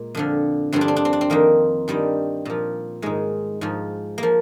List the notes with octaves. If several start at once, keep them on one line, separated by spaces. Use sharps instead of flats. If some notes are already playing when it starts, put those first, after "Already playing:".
Already playing: A#2 G#3
F2 D3 F3
G2 D3 F3 C4
D4
C4
D4
C4
D4
C4
F2 D#3 A#3
G2 D#3 G3
A#2 F3
G#2 D#3 G#3
G#2 F3
F3 A#3